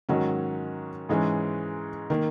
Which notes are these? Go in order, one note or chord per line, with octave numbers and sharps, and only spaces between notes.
G#2 D#3 F#3 C#4
G#2 E3 G#3 C#4
D#3 A#3